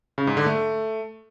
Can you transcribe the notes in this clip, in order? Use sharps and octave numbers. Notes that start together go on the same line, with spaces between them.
C#3
G#2
D3
A3